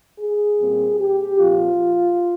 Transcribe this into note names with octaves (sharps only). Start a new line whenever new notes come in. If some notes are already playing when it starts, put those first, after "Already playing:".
G#4
A#2 G3 C4
G4
A#2 F3 C4 F4